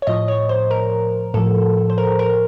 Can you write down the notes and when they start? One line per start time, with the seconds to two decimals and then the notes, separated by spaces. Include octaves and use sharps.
0.02 C#5
0.07 A2 F3 D#5
0.28 C#5
0.49 C5
0.71 A#4
1.34 A2 F3 A4
1.90 C5
1.98 A#4
2.19 A#4